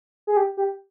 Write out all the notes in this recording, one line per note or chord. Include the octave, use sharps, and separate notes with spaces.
G#4
G4
G4